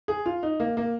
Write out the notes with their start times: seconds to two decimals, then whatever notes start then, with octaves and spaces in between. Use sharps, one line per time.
0.08 G#4
0.26 F4
0.43 D#4
0.60 A#3
0.77 A#3